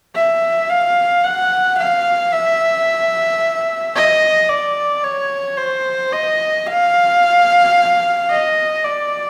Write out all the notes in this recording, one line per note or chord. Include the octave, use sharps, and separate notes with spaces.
E5
F5
F#5
F5
E5
D#5
D5
C#5
C5
D#5
F5
D#5
D5